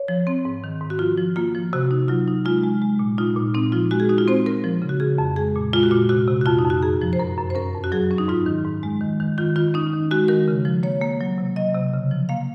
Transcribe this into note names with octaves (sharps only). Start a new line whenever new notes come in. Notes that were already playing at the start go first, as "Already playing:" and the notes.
Already playing: C#5
F3
C4
G#2
D#3
G#2
F#4
F3 F4
F3
A#3 F4
F3
C3 F#4
D#4
F#3 F4
D#4
G#3 F4
G#3
G#3
A#2
D#4 F4
A#2
C4 D#4
F3 F4
G#3 F#4
G#4
D#4 F#4
F4
C4 C5
C4 A#4
F3
C#3
F#4
C#3 G#4
F2
G#3 G#4
A#2
G#3 F4
F#4
A#2 F4
C3 F#4
C3
F#4
F2 F4
D#4
F2
F#4
F#2 G#4
F3
C5
F#2 A#4
F#2
C5
C#4 A#4
F2
F#4
F#3 G#4
C#4
D#4
G#2 F4
D#3
G#2
G#3
D#3
D#3
D#3 F4
D#3 F4
C#4 D#4
D#3
G#3 F#4
D#3 A#4
C#3
F3
A#3 C#5
A#3
F#3
C3
F#3 D#5
C3
C#3
F3
A#3 F5